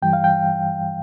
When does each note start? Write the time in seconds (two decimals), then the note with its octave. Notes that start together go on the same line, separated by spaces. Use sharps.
0.02 G2 E3 G3 G5
0.13 F5
0.24 G5